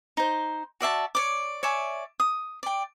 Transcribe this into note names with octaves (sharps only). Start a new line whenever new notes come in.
D#4 C5
F#4 D5 E5 A5
C#5 D5 D6
C#5 D5 E5 G#5
D#6
D5 G5